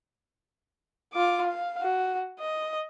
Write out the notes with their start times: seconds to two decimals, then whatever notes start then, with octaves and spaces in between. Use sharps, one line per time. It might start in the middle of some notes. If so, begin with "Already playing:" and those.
1.13 F4 D6
1.47 F5
1.81 F#4
2.39 D#5